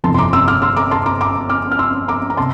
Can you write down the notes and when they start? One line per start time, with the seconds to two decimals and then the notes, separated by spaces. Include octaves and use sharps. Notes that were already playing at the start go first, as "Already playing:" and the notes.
0.04 G1 F2 C3 E3 A5 C6
0.14 C6
0.18 A#5 D6
0.33 C6 E6
0.48 D6 F6
0.62 C6 E6
0.77 A#5 D6
0.91 A5 C6
1.06 A#5 D6
1.21 A#5 D6
1.50 D6 F6
1.71 F6
1.79 C6 E6
2.08 A#5 D6
2.30 A#5
2.37 C3 A5 C6